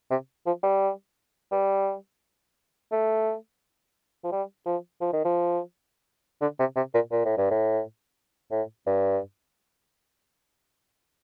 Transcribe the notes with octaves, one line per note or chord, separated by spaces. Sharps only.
C3
F3
G3
G3
A3
F3
G3
F3
F3
D#3
F3
D3
C3
C3
A#2
A#2
A2
G2
A2
A2
G2